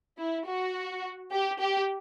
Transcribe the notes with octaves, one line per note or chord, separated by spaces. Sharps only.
E4
F#4
G4
G4